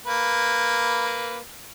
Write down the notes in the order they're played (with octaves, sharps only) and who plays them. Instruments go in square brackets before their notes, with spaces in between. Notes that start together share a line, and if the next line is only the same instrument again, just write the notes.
[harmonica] A#3 B4